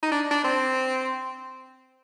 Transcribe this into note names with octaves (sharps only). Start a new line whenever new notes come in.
D#4
D4
D4
C4